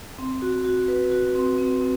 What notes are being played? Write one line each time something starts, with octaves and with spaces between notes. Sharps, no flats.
C4
F#4
F#4
B4
F#4
C4
C4
C4